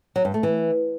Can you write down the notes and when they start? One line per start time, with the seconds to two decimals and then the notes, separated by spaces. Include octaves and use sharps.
0.16 F#3
0.25 G2
0.34 A3
0.43 E3